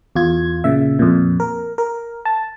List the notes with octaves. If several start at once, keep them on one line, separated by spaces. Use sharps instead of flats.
E2 F4 G#6
A#2 C#3 E5
F2 A#2
A#4
A#4
A5